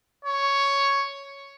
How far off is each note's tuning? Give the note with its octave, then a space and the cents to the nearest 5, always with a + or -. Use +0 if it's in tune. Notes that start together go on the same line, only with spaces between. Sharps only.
C#5 +5